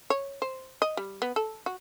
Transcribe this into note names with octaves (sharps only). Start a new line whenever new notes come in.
C#5
C5
D#5
G3
B3
A4
F#4